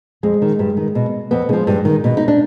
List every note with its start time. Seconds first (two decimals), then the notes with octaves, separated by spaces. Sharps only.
0.23 F2 G#3
0.42 D#3
0.59 G2
0.77 D#3
0.95 B2
1.31 F2 B3
1.49 D3 F3 G#3
1.67 G2
1.85 D#3
2.04 B2
2.17 D#4
2.28 D4